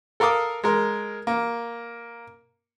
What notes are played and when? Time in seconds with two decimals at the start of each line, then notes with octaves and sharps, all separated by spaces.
0.20 A4 A#4 F5 D6 D#6
0.64 G#3 A#4
1.27 A#3